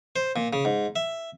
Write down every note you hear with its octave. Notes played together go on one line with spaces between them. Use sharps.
C5
A#2
C#3
G#2
E5